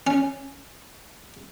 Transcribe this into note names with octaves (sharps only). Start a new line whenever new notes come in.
C#4